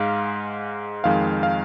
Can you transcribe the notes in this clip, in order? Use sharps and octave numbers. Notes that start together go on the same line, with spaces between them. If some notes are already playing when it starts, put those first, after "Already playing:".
Already playing: G#2 G#3 F5
F2 D#3 G#3 F5
F5